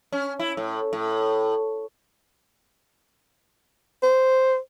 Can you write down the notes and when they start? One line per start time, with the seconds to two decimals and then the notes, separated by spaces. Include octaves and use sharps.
0.12 C#4
0.39 E4
0.57 A2
0.93 A2
4.03 C5